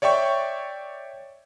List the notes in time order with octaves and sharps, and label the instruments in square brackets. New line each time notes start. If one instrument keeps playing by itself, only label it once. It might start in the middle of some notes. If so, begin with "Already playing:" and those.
[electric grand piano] C#5 D5 E5 G5 C#6